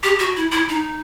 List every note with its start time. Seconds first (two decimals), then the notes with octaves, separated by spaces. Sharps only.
0.03 G4
0.19 F#4
0.36 E4
0.52 E4
0.69 D#4